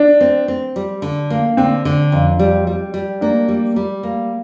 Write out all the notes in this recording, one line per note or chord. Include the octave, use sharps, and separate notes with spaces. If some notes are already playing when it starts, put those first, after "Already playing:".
Already playing: D4
C4
C4
G3
D3
A#3
D3 C4
D3
F2
G3
G3
G3
A#3 D4
G3
G3
A#3